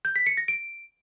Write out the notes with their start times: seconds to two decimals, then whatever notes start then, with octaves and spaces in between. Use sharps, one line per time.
0.05 G6
0.16 B6
0.26 C#7
0.37 A#6
0.48 D7